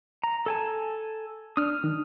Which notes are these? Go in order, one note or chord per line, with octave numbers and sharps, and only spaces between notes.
A#5
A4 G#5 A5
D4 D#6 F6
D#3